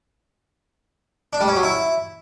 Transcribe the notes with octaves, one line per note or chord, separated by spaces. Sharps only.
D4
G3
C#4
F#3
E4